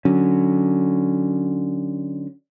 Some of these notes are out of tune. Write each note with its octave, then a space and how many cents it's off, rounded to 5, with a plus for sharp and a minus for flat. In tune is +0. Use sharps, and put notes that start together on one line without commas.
D3 +10 F#3 +0 C#4 +0